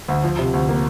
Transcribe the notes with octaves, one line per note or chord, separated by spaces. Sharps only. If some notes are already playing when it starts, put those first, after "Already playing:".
D2
F3
C3
D2
A#3